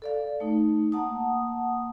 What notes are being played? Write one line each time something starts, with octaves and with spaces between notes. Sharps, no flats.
A4 D5 F5
A3 D#4
A#3 F#5 A5 D#6